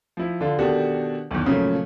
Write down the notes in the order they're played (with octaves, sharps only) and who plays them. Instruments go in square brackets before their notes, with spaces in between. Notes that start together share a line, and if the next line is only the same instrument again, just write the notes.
[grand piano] F3 E4
D3 D4 F4
B2 D#3 D4 F#4 G4 A4
B1 E2
A#2 C#3 F3 F#3 A3